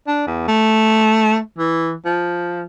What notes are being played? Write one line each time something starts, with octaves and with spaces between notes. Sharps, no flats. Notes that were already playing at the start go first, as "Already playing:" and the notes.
D4
E2
A3
E3
F3